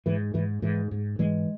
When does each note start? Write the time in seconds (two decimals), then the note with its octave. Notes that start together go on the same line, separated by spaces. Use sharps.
0.06 G#2 E3
0.34 G#2 E3
0.62 G#2 E3
0.91 G#2
1.19 G#2 E3 G#3